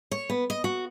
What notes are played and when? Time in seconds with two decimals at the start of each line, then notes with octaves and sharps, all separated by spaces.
0.11 C#5
0.30 B3
0.50 D#5
0.64 F#4